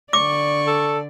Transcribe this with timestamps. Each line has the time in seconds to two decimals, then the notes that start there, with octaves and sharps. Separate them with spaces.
0.13 D3 D5 C#6 D6
0.67 A4